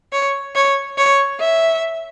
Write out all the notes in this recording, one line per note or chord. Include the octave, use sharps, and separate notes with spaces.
C#5
C#5
C#5
E5